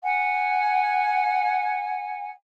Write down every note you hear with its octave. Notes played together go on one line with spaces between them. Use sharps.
F#5 G#5